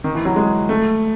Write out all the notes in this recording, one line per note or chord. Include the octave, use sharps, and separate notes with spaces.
D#3
E3
F#3
G#3
A3